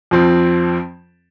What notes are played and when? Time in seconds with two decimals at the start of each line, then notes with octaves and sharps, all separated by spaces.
0.11 F2 F3 C4